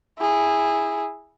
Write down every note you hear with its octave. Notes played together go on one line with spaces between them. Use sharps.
E4 G#4